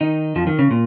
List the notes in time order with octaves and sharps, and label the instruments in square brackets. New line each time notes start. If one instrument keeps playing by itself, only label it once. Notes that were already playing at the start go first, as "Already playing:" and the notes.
[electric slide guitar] D#3 D#4
F2 F3
D#3
C#3
A#2